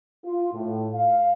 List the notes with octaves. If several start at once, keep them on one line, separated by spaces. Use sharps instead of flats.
F4
A2
F5